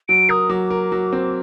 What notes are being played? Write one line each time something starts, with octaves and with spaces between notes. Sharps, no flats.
F#3 D7
A#4 D#6
F#3 D6
A#4
F#3
C4